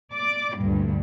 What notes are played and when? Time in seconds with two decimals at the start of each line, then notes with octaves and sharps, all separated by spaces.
0.12 D5 D6
0.59 D2 G2 A#2